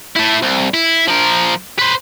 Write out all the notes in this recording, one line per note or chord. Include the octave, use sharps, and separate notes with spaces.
A3 E4
C2
E4
F3 A#4
B4 C5